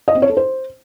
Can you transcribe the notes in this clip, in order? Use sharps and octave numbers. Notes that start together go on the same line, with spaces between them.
D#5
C4
C#5
A4
C5